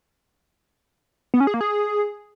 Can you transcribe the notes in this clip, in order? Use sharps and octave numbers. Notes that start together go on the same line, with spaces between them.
B3
C#4
G#4
A#3
G#4